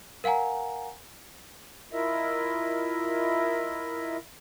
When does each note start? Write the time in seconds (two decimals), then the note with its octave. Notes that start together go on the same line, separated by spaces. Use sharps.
0.24 A#4 F5 F#5 G#5 A#5
1.93 E4 F4 A#4 D#5 E5